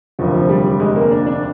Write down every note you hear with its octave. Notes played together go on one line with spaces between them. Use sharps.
F1 D#2 D3 F3
F3
G3
G3
G#3
A#3
D4
D4